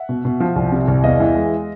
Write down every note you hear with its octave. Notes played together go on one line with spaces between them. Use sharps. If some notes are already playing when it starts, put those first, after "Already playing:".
Already playing: E5 F#5
B2
B2
F3
C2
C3
C2
E2 D#5 F5
E3
G#3